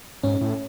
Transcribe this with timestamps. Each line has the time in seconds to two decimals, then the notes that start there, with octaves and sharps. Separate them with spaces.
0.23 G#2 C#4
0.41 A2